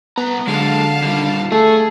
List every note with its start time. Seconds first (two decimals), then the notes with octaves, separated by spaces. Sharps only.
0.17 C2 B3 A#5
0.47 D3 F#3 G#3 F5 A5
1.02 D#2 G3
1.52 A3 G#4 A4